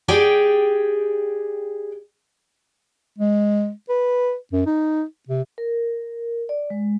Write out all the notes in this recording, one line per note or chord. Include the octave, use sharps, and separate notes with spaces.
G4 G#4 D5 G5
G#3
B4
F#2
D#4
C3
A#4
D5
G#3